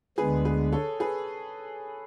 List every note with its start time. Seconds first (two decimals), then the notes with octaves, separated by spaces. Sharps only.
0.18 D2 D3 G#3 B3 G#4 B4
0.45 G#4 B4
0.72 A4 C#5
1.00 G#4 B4